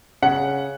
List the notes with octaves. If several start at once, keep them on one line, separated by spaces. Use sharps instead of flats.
C#3 F#5